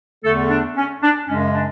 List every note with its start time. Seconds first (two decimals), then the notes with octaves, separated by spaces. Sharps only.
0.24 E2 D3 A3 A4
0.50 D4
0.77 C#4
1.02 D4
1.28 F#2 C#3 G#3 C#4
1.54 D4